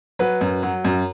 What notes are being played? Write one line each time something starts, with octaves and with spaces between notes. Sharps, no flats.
F#3 B4
F#2
F#3
F#2